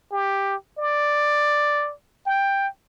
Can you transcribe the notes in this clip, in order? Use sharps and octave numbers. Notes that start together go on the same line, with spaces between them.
G4
D5
G5